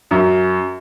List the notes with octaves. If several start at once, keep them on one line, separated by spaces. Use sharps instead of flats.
F#2